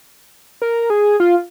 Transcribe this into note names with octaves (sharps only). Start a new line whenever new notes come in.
A#4
G#4
F4